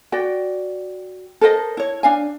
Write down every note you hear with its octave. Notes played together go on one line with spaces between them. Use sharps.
F#4 D5 G5
A4 A#4 C5 D#5
E4 C#5
D4 F5 G#5